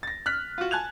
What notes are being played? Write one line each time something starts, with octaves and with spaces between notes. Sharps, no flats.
A6 A#6
F6 F#6 B6
F4 F#4
G#5 A5 F#6 G#6 F7